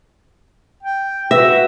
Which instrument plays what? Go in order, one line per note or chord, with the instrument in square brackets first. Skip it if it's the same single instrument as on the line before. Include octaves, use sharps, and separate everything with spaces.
[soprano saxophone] G5
[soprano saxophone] F#4 [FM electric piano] B4 A#6 [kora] E5